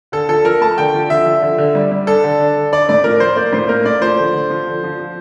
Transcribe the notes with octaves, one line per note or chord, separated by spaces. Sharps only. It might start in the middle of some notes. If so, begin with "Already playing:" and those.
D3 A4
F3 A4
F3 A#4
A3 A5
D3 G5
F3
D3 E5
F3
D3
D3
G3
G3
D4 A4
D3
D4
D3
D4 D5
A2 D5
F3 A#4
F3 C5
A#3 D5
A2 C5
A#3 A#4
A2 D5
F3 C5
D3
D3
F3
D3
F3
F3